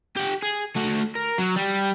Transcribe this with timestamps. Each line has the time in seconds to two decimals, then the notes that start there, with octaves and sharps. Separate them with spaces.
0.16 G4 F#5
0.42 G#4
0.76 A3 F#4
1.15 A#4
1.38 F#3
1.56 G3